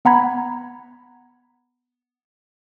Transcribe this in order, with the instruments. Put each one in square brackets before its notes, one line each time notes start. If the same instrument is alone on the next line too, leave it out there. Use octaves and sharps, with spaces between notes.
[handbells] B3 F#5 A#5 B5 G#6